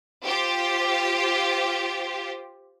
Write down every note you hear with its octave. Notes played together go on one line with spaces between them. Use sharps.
F4 G4 C5